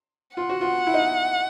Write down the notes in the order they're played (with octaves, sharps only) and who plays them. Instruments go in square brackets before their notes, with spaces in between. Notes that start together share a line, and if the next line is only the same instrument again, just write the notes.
[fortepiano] F4 [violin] F#5
[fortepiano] F#4
F4
E4
D#4